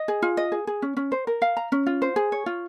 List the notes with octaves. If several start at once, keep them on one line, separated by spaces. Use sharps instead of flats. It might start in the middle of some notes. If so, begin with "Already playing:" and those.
Already playing: D#5
G#4
F4
D#5
G#4
G#4
C#4
C#4
C5
A#4
F5
A#5
C#4
F4
C5
G#4
C#5
F4